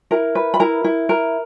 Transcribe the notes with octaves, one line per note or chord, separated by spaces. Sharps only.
E4 A#4 A#5
B4
B5
E4 A#4 A#5
E4
A#4